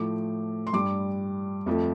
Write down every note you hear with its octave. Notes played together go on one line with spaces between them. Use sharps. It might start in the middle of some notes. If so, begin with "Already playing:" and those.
Already playing: A2 F3 A3 D6
C6
G2 G3 D6
F2 F3 A3